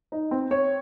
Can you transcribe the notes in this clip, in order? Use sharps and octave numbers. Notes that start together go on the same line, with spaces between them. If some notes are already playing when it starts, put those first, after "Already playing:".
D#4
C4
C4 C#5